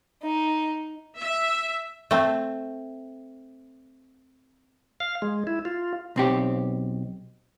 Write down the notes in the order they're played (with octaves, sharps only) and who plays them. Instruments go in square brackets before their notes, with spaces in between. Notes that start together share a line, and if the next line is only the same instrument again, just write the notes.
[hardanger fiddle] D#4
[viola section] E5
[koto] A3 C4
[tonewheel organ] F5
G#3
E4
F4
[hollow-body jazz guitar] B1 C4 G4